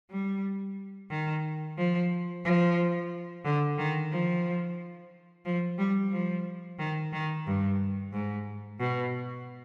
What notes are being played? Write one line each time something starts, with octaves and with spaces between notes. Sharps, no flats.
G3
D#3
F3
F3
D3
D#3
F3
F3
G3
F3
D#3
D#3
G2
G#2
B2